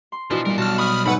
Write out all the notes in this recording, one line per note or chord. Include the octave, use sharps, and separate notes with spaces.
C6
B2 E3 F3 D4
A#2 G3 A#4
B1 F#4 A5 F6
B5 C#6 D#6 F6
G#2 A3 C#4 B4 F#5 B5